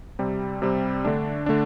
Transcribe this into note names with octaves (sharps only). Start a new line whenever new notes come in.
C3 G3 C4
C3 G3 C4
D3 A3 D4
D3 A3 D4